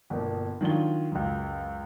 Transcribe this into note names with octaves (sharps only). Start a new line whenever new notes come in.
G1 G2 B2 A#3
D#3 F#3 D4 F4 G7
C#2 F#2